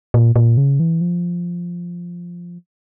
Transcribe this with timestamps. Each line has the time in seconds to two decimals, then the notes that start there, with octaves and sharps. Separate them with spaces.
0.14 A#2
0.36 A#2
0.57 C#3
0.80 E3
1.01 F3